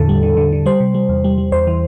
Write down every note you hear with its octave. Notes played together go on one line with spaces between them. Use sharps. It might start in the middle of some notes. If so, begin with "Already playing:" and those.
Already playing: E2 A2 D3 A4
G3
D3
D3
D3
G3 C5
C3
G3
E2
G3
G3
E2 C5
E3